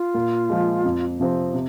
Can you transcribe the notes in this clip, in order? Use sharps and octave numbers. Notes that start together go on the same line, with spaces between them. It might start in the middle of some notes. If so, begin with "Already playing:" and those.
Already playing: F4
A#2
F3 G#3
F2
C3 F3 C4
C3